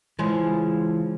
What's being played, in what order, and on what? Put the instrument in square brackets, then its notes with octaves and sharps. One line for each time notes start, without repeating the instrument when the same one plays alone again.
[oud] C#3 F3 G#3 [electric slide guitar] E3